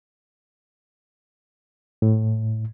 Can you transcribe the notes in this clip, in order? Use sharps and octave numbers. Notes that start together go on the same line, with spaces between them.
A2